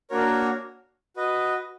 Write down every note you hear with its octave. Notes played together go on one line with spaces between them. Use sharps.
A#3 D4 F#4 A#4 C#5
F#4 B4 D#5